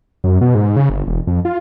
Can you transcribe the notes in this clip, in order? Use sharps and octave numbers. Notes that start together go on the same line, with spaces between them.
F#2
B2
G#2
C#3
G1
E1
F2
F4